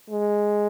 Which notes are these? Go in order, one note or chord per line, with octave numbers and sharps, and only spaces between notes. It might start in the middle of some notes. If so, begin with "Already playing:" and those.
G#3